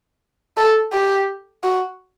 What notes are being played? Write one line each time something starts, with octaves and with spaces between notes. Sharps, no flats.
A4
G4
F#4